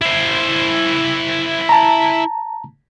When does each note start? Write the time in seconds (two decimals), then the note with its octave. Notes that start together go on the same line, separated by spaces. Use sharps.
0.01 E4 C5
1.69 A5 A#5